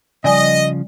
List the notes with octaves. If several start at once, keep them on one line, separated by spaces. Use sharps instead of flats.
C#3 F3 G3 D5 D#5 G#5